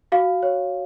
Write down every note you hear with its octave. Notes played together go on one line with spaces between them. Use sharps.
F#4 F5
C#5